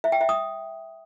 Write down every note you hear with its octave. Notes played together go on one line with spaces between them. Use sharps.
E5
G5
E5
D#6